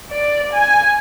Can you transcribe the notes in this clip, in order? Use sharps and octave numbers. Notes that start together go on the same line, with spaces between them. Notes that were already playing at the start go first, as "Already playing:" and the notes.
D5
G#5